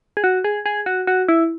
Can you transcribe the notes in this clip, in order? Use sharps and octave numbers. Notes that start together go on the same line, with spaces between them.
G#4
F#4
G#4
G#4
F#4
F#4
E4